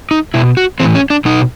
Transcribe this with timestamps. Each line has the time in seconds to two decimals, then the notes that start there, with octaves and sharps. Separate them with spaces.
0.11 D#4
0.34 B2 E4
0.57 F#4
0.80 A2 E3 C4
0.95 C#4
1.10 D4
1.25 B2 D#4